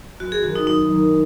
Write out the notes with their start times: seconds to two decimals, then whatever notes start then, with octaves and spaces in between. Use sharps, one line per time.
0.20 F#2 F#4
0.32 G#4
0.43 D#3 F#3 F#4
0.56 D#4
0.67 F#2 D#4
0.90 D#3 F#3